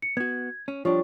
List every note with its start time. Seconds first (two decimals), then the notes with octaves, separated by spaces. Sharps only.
0.02 C#7
0.17 B3 F#4 G#6
0.68 C#4
0.85 F3 G3 D4 F4 C#5 C#6